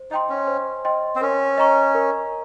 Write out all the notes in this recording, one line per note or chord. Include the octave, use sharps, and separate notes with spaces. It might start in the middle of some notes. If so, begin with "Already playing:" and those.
Already playing: C5
D#4 D#5 G5 C6
C#4
C5
D#5 G5 C6
C4
C#4 A#4
D#5 A#5 C#6
A#4